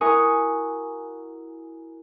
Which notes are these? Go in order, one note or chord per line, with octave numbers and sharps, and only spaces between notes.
E4 F#4 A#4 G#5 C#6 D#6